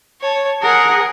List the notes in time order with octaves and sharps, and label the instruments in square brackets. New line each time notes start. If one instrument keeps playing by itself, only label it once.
[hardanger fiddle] C#5 A5
[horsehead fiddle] G#4 F#5 [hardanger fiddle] A#4